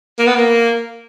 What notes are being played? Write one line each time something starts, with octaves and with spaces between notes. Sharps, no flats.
A#3
B3
A#3